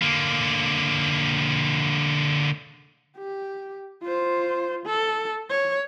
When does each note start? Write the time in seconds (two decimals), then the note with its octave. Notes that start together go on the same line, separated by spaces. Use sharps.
0.02 D3 A#3
3.17 G4
4.03 F4 C5
4.86 A4
5.50 C#5